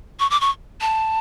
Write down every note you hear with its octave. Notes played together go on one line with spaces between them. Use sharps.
C#6
D6
C#6
A5